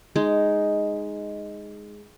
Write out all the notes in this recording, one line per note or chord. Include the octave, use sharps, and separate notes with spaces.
G#3 D#4